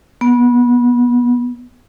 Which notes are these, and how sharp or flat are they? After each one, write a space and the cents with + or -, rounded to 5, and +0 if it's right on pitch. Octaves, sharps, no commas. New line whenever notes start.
B3 -25